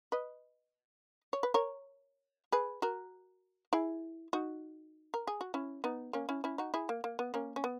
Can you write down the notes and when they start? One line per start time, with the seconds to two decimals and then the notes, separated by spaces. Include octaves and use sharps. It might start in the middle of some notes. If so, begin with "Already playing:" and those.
0.12 B4 D#5
1.33 C#5
1.43 B4
1.54 A#4 C#5
2.52 G#4 B4
2.82 F#4 A#4
3.73 E4 G#4
4.33 D#4 F#4
5.14 A#4
5.27 G#4
5.41 F#4
5.54 C#4 E4
5.84 B3 D#4
6.13 A#3 C#4
6.29 C#4 E4
6.44 C#4 E4
6.58 D#4 F#4
6.74 E4 G#4
6.89 A#3
7.04 A#3
7.19 B3
7.34 A#3 C#4
7.56 C#4
7.64 B3